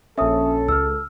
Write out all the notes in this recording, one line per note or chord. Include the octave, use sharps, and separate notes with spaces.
A#1 C#4 A4 E5 D#6
C#2 E6 F6